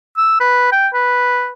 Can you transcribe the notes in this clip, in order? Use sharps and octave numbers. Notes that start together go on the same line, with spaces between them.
E6
B4
G5
B4